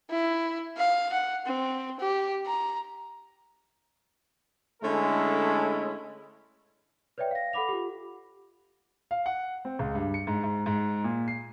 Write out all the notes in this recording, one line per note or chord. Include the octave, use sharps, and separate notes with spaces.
E4
F5
F#5
C4
G4
A#5
D3 G#3 A3 C#4 E4 A4
B4 C#5 D5 E5 G5
F5 A#6
A4 F#5 B5 D6 F7
F4 G4
F5
F#5
C4
C#2
G2
C#7
G#2
G#2
G#2
A#2
C7